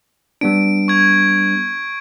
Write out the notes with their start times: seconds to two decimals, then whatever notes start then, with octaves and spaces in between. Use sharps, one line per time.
0.41 G3 B3 D4 D7
0.88 C#6 G#6